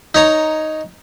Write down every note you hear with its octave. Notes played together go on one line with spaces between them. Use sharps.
D#4 C#5 A#5